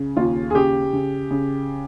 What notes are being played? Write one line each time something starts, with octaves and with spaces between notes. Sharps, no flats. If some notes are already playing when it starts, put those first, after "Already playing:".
Already playing: C#3
D#2 F4
G#4
C#3 G4
C#3
C#3